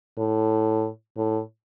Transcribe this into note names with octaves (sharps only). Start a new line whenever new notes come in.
A2
A2